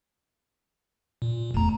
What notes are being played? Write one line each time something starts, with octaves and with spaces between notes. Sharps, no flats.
A#2
E2 D3 A3 A#5